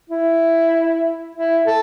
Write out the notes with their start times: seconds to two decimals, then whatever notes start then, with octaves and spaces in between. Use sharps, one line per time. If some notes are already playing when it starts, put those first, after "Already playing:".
0.10 E4
1.35 E4
1.67 A4